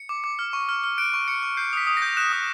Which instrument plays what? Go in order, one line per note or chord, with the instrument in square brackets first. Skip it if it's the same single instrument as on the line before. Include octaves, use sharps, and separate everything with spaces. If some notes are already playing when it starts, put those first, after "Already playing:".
Already playing: [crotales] C#7
D6
D6
F6
C#6
F6
F6
F#6 D7
C#6
C#6 C#7
C#6
G6 C7
D#6 B6
D#6
A#6
G6
F#6 E7
D#6